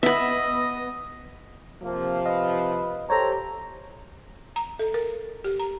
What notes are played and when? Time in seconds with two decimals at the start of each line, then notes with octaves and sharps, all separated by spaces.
0.03 B3 D#5 E5 B5
1.83 C3 F3 A#3
2.25 B4 D#5 F5
3.10 G4 A4 C5 C#5 A#5
4.56 A#5
4.79 A4
4.94 A#4
5.44 G4
5.60 A#5